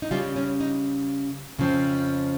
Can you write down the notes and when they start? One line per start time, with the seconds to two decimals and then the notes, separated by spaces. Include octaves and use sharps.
0.02 D#4
0.11 C#3 G3 C#4 F4
0.36 C#4
0.60 D#4
1.58 F2 C#3 F3 C4